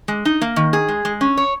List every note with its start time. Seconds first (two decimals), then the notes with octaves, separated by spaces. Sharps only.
0.08 G#3
0.25 D#4
0.41 A#3
0.56 D#3
0.73 G#4
0.89 G#3
1.05 G#3
1.21 C#4
1.37 C#5